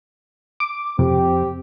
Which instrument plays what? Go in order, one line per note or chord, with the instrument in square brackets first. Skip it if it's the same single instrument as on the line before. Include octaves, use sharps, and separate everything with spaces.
[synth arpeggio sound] D6
[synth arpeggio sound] F2 C3 [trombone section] C4 G4